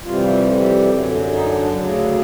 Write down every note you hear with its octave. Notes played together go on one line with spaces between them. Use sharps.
F2 C3 E3 G3 F4
F#2 D3 F#3
D#4
D4
D4
D2 C#3 F#3